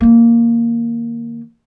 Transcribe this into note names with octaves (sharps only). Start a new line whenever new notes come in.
D#3 A#3